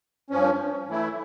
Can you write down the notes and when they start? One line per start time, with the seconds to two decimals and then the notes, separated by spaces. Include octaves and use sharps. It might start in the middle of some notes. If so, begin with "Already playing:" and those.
0.30 G2 F3 C#4
0.88 E3 A3 E4